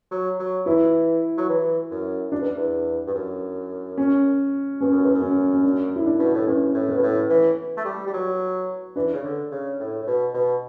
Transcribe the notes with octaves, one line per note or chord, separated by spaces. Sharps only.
F#3
F#3
E3 E4
F#3
E3
F#2
F#2 D4
E2
E2
G2
F#2
C#4
G2 C#4
F#2
E2
F#2
C#4
C#4
D4
E4
D4
B2
A2
G2 C#4
A2
B3
B2
A2
E3
A3
G3
G3
F#3
E3 D4
C#3
D3
C#3
A2
A2
B2
B2